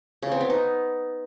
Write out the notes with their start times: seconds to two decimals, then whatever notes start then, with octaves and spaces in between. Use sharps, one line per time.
0.22 C#3
0.32 C4
0.41 B3
0.50 D#4